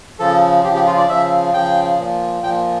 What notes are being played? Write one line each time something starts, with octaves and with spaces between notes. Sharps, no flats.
C#3 F3 A4
C#3 F3 G4
G4
F4
D5
C#3 F3 E5
C#3 F3 G5
A#2 F3
A#2 F3 G5